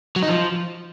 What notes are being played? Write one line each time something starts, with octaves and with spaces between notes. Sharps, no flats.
F#3
D#4
F3